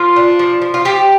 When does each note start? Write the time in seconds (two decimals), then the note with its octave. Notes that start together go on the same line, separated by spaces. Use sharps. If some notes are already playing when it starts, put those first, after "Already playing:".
Already playing: F3 F4
0.16 D4
0.39 F3
0.62 F3
0.74 F4
0.85 F3 G4